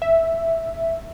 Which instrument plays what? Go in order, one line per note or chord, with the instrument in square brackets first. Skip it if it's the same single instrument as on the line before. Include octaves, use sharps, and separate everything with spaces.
[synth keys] E5